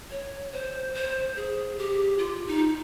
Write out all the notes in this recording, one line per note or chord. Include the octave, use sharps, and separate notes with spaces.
C#5
C5
C5
G#4
G4
F4
D#4